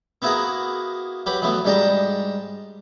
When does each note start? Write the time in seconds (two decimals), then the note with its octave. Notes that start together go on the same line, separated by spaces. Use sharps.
0.22 A#3 B3 E4 F#4 G#4 A#4
1.26 F#3 G4 B4 F#5
1.42 E3 F#3 A3 B3
1.65 G#2 G3 D4 G5 A5 A#5